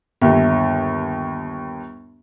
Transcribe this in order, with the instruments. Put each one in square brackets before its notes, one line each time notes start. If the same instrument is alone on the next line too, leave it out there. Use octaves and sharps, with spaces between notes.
[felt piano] G1 D#2